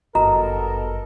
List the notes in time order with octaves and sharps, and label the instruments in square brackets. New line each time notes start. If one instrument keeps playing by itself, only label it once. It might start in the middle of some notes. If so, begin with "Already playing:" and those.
[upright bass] G1 F#2 [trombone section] B3 A4 A#4 [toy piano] F#4 A#5 [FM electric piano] D#5